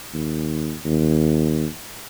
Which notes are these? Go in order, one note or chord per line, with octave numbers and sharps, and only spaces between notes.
D#2
D#2